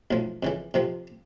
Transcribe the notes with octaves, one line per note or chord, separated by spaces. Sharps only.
B1 A2 F3
F2 C#3 E3
F2 C3 F3